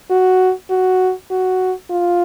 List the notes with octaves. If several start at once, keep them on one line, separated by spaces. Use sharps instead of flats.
F#4
F#4
F#4
F4